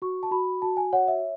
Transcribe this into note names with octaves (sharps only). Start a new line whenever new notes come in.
F#4 C#6
A5
F#4 B5
F#4 A5
G#5
C#5 F#5
E5